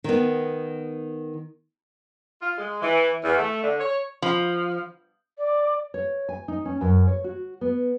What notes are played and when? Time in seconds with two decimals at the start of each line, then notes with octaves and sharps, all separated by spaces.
0.04 D#3 B3
2.41 F4
2.58 G#3
2.82 E3
3.23 E2
3.37 A3
3.63 D3
3.79 C#5
4.22 F3
5.38 D5
5.94 C#5
6.29 G#5
6.48 D#4
6.65 C#4
6.81 F#2
7.07 C#5
7.24 F#4
7.61 B3